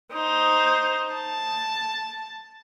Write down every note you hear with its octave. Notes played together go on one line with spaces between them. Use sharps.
D#4 C5
A5